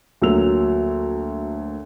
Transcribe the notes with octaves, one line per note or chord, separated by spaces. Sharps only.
D2 F#3 A#3 E6 F7